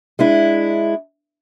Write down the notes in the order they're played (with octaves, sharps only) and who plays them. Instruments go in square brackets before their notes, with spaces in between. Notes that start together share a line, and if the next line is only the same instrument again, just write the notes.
[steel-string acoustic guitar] G#3 D4 E4